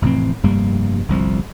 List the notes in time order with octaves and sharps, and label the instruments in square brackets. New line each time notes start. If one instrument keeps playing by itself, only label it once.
[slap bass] F1 A2 E3 C4
F1 G2 G3 A#3
G1 C2 F3